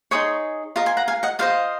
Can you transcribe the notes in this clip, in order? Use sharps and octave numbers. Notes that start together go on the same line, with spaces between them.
D#4 G#4 C#5 C6 D#6
F4 A#4 D#5
G#5 C6
F#5 A#5
F5 G#5
D#5 F#5
F4 C5 D#5 F5